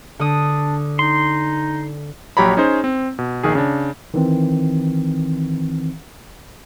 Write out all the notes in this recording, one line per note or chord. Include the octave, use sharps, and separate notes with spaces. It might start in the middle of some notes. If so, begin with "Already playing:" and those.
D3 D4 D#6
D#4 C6
A#1 F#3 G4 C#5 A#5 B5
C#4 D#4 G#4 C5
C4
B2
A#1 D#3 G#4
C#3 D4
D#3 E3 C4